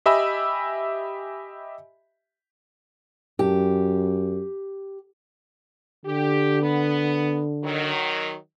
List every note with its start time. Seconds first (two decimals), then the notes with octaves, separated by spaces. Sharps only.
0.06 G4 D#5 E5 G#5 B5 E6
3.39 F#2 G4
6.06 D3 G4
6.62 B3
7.64 D#3 F#3